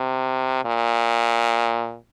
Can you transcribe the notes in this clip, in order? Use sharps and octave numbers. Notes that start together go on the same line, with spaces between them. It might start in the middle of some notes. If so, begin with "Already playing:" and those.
Already playing: C3
A#2